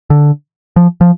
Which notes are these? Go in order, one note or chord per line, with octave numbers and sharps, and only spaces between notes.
D3
F3
F3